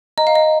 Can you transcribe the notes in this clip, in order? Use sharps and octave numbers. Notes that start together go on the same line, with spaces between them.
D#5 A#5
F5
D#5